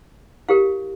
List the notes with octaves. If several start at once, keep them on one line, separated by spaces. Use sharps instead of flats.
E4 G4 A#4 F5